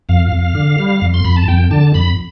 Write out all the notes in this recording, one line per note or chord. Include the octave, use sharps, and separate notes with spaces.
F2 F5
F2
D3
G3
F2
C6
F2 B5
A5
F2 G5
D3 A5
F2 B5